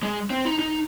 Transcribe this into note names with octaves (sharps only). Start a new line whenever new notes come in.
G#3
C4
D#4
D#4